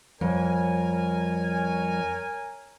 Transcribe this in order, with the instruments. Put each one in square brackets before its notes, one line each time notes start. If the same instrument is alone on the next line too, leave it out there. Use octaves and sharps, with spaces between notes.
[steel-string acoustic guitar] F2 [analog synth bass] G3 [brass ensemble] A#4 C#5 G#5